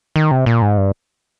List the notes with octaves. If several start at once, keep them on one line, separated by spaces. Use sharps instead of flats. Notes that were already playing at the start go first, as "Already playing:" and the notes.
D#3
C3
A#2
G#2
G2